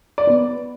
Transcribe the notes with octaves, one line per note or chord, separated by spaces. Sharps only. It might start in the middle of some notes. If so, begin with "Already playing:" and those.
D5
B3